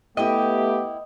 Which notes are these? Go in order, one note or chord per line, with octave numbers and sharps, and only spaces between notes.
A3 B3 E4 G4 D#5 G5